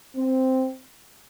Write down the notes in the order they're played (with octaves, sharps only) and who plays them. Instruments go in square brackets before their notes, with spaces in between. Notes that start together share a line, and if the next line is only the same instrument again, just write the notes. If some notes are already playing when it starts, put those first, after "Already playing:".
[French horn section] C4